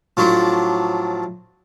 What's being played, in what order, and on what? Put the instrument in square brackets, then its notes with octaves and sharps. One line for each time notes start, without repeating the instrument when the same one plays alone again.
[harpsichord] A2 F3 F#3 D4